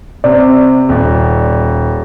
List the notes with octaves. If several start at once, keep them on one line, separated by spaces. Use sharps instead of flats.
C3 C4 D5
D#1